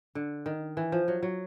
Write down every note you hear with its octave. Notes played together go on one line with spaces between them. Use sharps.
D3
D#3
E3
F3
F#3
F#3